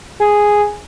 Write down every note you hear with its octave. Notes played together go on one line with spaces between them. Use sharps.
G#4